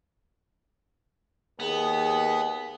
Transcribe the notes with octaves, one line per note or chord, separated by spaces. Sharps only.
D#2 B3 G#4